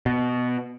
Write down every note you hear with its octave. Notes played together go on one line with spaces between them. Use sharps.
B2